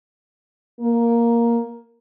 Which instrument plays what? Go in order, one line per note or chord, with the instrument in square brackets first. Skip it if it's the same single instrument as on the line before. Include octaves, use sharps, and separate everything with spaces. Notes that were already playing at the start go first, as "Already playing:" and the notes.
[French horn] A#3